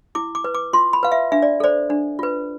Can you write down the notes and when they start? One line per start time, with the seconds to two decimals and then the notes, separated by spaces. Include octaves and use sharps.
0.15 E4 D6
0.35 D6
0.44 B4
0.54 D6
0.73 F4 C6
0.93 B5
1.03 B4 F5
1.12 E5
1.32 D4 E5
1.42 D5
1.60 A4 C5 D5
1.90 D4
2.19 F4 B4